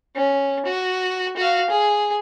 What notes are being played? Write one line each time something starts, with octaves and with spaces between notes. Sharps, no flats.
C#4
F#4
F#4 F5
G#4